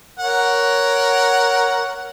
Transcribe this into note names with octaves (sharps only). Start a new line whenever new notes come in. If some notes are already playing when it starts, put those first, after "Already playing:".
A#4 C#5 F#5